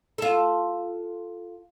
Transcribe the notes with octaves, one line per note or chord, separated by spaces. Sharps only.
F4 A4